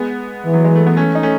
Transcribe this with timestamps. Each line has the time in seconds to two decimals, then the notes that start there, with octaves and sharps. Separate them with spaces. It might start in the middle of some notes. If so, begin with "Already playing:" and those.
Already playing: G#3 B3
0.44 E3
0.54 F#3
0.65 G#3
0.75 A3
0.87 B3
0.97 A3 C#4
1.15 D#4
1.23 A3 C#4